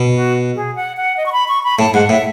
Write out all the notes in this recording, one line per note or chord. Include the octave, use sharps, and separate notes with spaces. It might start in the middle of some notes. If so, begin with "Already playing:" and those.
Already playing: B2
F#4
G#4
F#5
F#5
D#5
C#6
B5
C#6
B5
A2 A5
G#2 F#5
A2 E5